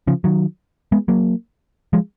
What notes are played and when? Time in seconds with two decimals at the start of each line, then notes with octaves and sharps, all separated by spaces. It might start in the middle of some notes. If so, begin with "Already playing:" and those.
0.07 C#3 F3
0.24 D#3 F#3
0.92 G#3 B3
1.08 F#3 A#3
1.93 F3 G#3